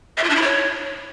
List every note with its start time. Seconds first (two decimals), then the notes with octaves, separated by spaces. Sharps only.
0.17 E5
0.23 F4
0.30 D4
0.36 E4
0.42 C#5